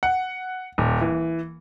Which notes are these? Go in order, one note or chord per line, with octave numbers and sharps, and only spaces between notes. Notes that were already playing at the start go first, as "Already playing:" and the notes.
F#5
D#1
E3